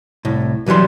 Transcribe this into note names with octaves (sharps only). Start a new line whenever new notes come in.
C2 A2
B1 E3 F#3 G3 C6